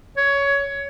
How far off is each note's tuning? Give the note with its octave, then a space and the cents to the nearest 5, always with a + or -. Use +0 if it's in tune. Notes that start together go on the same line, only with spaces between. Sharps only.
C#5 +15